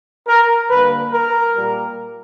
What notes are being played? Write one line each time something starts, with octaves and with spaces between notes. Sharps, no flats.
A#4
D3 G3 A#3 B4
A#4
A#2 G3 A#3